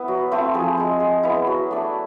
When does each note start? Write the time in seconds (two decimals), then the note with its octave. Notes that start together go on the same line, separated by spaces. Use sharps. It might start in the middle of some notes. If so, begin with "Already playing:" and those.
Already playing: B3 E4
0.08 F#3
0.32 A3 C4 E4
0.54 F3 G#4
0.77 G#3 C4
1.00 G#3
1.23 B3 E4
1.47 F#3
1.71 A3 D4